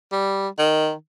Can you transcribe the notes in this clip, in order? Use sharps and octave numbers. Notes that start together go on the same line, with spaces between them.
G3
D#3